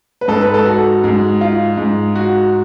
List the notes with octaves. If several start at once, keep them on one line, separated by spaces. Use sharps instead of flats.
B4
G#2 A4
B4
A4
F#4
G#2
F4
G#2
F#4